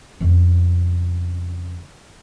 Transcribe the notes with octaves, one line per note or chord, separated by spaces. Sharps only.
F2 C#3